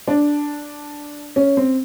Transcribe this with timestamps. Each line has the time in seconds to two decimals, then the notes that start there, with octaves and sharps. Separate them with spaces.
0.07 D4
1.36 C#4
1.57 C4